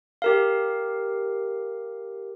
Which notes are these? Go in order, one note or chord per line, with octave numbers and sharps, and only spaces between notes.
G4 A#4 F5